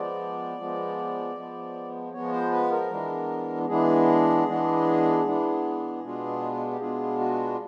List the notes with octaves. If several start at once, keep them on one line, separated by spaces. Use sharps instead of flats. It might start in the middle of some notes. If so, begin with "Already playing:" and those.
Already playing: F3 G#3 B3 D5
F3 G#3 B3
F3 G#3 B3
F3 G#3 B3 C#5
C5
B4
A#4
E3 G#3 B3 D4
E3 G#3 B3 D4 G#4
E3 G#3 B3 D4
E3 G#3 B3 D4
B2 G#3 B3 D4 F4
G4
B2 G#3 B3 D4 F4 G#4
F#4